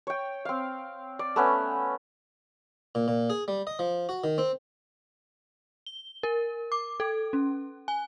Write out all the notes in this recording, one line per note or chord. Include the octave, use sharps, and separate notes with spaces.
C#5 G5
C4 F5
D5
A3 B3 C#4
A#2
A#2
G#4
G3
D#5
F3
F#4
D#3
C4
G7
A#4
D6
A4
C#4
G#5